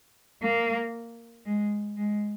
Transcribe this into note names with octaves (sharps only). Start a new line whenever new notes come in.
A#3
G#3
G#3